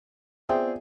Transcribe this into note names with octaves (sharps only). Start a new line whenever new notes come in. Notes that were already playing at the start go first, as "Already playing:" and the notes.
B3 C4 F4 G#4 D5 E5 G5